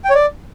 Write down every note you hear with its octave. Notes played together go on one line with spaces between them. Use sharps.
G5
C#5
D5